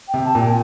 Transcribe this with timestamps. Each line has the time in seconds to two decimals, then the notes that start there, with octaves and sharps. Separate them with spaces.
0.08 G5
0.14 C3
0.25 A5
0.35 A#2 G5